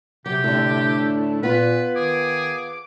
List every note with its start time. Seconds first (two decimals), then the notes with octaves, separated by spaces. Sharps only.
0.26 C3 F#3 G4
0.44 A2 D3 A3 D4 E4
1.43 A#2 B3 F4 B4
1.96 D#3 G#4 D6